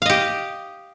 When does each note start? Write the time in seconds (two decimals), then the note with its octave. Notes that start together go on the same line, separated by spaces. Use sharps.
0.02 F5
0.06 D#5
0.09 G4